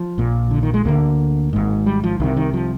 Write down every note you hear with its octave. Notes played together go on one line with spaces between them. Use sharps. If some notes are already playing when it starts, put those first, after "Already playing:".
Already playing: F3
A#1 A#2
D3
D#3
G#3
D2 D3 A#3
G#1 G#2
G3
F3
C2 C3 D#3
D#3
F3